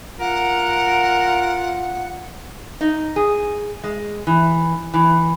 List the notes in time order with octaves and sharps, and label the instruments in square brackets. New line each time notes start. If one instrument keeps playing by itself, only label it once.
[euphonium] F4 [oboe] A#4 [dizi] F#5
[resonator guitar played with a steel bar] D#4
G#4
G#3
E3
E3